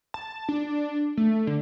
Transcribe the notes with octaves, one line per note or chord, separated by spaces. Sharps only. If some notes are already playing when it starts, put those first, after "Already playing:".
A5
D4
A3
D3